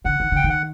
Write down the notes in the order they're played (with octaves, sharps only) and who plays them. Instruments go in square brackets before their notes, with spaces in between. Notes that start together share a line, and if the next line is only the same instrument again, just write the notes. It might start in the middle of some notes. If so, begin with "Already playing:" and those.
[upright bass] D3 [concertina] F#5
[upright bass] D#3
[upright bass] D3 [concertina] G5
[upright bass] D#3
[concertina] F#5